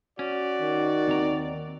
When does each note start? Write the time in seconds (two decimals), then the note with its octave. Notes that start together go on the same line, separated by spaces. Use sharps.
0.19 C#4 F#4 D5
0.61 D#3
1.08 D#2 C4 A#5